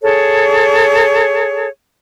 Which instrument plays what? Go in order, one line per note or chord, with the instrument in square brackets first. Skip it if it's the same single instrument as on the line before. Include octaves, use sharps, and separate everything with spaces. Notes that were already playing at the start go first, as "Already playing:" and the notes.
[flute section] G#4 A4 C#5